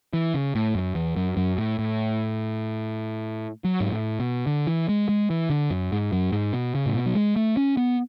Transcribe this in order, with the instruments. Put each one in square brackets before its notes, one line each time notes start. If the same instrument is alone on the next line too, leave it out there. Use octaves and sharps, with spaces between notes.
[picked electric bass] E3
C#3
A2
F#2
E2
F#2
F#2
A2
A2
F#3
G#2
A2
B2
D3
E3
G#3
G#3
E3
D3
F#2
G#2
F#2
G#2
B2
C#3
A2
B2
F#3
G#3
A3
C#4
B3